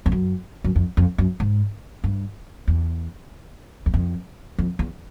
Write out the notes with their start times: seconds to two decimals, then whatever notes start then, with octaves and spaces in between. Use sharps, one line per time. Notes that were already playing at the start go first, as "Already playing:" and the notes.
0.06 F2
0.12 F#2
0.64 F#2
0.76 F2
0.97 F2
1.18 F#2
1.40 G#2
2.04 G2
2.68 E2
3.86 E2
3.94 F2
4.58 F2
4.79 E2